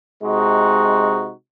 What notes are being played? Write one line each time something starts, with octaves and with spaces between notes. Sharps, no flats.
C3 G#3 D#4 F#4